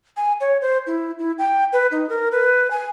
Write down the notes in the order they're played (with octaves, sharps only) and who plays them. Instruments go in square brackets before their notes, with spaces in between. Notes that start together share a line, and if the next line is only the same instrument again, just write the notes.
[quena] G#5
C#5
C5
E4
E4
G5
B4
D#4
A#4
B4
G#5